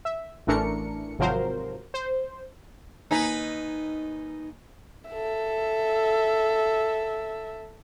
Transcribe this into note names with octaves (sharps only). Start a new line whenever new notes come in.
E5
A1 E3 A3 D4 A#4 C#7
G#1 C3 F3 F#3 A#4 C5
C5
D#2 D#4 B4 G#5 A#5
A4 E5